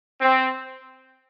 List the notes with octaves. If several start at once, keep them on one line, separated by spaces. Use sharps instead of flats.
C4